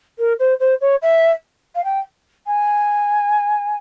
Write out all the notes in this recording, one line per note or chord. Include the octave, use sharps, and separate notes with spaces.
A#4
C5
C5
C#5
E5
F5
G5
G#5